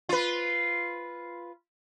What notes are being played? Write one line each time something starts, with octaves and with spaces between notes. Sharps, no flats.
F4 B4